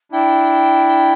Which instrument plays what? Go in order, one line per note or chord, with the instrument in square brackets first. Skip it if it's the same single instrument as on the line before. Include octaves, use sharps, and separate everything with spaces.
[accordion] D4 E4 [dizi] G5